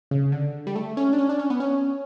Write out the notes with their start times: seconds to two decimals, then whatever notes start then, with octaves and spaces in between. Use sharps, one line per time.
0.11 C#3
0.32 D3
0.67 G3
0.76 A3
0.97 C#4
1.13 D4
1.19 C#4
1.29 D4
1.39 C#4
1.50 B3
1.60 C#4